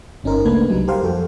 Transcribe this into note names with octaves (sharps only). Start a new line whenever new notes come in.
G1 C#4 D#4 A#4 C5
C#2 A3 A#3 D4 B4 G#6
C2 F#3 G3 D#4
G4 A4 A#4 C5 F5 F#5
F2 F#4 A4 G5